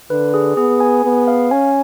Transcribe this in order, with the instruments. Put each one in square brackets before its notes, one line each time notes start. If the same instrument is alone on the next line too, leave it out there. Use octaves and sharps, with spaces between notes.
[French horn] D3 [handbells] B4
[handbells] G#4
[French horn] B3 [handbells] G#4
[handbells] G#5
[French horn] B3 [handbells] G#4
[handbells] F5
[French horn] C#4 [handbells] G#5